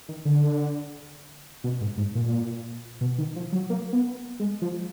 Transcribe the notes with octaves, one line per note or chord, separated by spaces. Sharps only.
D#3
D3
B2
G#2
G#2
A#2
B2
D#3
F3
F#3
A#3
B3
G#3
F3